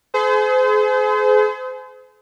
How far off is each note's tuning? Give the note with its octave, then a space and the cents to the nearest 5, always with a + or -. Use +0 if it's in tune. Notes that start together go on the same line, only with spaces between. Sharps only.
G#4 +35 C5 -35